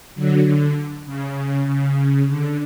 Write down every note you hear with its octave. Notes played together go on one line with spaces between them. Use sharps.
D3 F#3
D3
C#3
C#3
D3